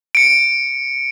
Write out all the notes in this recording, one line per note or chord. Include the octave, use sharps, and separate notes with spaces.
C#7 D7